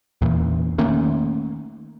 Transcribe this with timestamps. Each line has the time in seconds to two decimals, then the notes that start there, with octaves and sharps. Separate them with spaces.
0.22 E2 A#2
0.78 D#3 A3 A#3 C#4